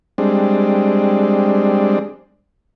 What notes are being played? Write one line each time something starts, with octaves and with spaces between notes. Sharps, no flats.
G3 G#3 C4 D4